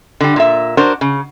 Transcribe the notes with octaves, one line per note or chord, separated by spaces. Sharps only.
D3 G3
A#2 E5
D4 F#4 A#4 C5
C#3